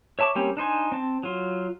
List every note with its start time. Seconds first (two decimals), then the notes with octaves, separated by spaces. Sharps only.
0.19 C#5 E5 A5 C#6 D6
0.35 G3 A#3 C4 C#4 G4
0.57 D4 D#4 C5 G#5
0.92 C4 A5
1.23 F#3 F4